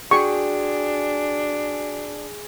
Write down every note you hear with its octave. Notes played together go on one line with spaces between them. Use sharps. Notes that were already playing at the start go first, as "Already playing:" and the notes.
D4 F#4 G#4 G5 G#5 C#6